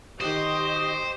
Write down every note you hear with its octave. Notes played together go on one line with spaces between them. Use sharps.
D#3 F#4 G4 C5 D#5 D#6